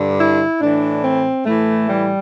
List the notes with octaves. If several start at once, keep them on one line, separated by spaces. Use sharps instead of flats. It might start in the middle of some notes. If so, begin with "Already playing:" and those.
Already playing: G2 D3
E4
A2 E3 D4
C4
A2 E3 A3
G3